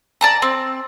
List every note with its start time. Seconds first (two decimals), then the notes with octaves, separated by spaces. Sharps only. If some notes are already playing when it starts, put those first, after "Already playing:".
0.21 D5 A5 A#5
0.42 C4